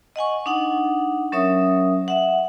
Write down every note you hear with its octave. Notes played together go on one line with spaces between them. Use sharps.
D#5 F#5 G#5 C#6
D4 D#4 F#5
F#3 C#4 A#4 C#5 E5 D#6
E5 F#5